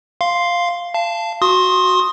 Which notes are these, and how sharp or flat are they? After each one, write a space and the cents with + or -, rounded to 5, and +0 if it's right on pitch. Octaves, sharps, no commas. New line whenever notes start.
F5 +0 C6 +0
F5 -25 A5 +0
F#4 +0 C6 +20 D#6 +0